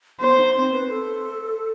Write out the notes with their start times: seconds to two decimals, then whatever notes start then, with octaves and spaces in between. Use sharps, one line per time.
0.21 B3 C5
0.38 D#4
0.55 C4
0.72 B4
0.89 A4